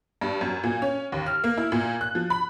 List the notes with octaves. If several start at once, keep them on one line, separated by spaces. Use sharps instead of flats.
G2
F#2
A#2
C#4
D#2
F6
A#3
E4
A#2
F#6
F3
B5